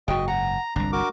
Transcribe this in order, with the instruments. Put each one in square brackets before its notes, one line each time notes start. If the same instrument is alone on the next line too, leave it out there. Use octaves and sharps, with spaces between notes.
[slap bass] F#1 G#2 [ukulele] F#4 G5 [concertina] D#5
[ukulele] F#5 [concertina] A#5
[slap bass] G1 C2 [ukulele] D4 [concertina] A#5
[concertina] F#4 A#4 D6